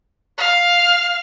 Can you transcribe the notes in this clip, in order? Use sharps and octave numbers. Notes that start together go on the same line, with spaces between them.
F5